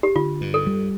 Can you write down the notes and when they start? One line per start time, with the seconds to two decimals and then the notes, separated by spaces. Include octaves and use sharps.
0.03 G4
0.15 D3 F4
0.41 G2
0.54 A4
0.67 G3